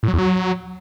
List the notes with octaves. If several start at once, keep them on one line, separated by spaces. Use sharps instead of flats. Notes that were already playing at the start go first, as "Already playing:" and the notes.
A2
F#3
E2
F#3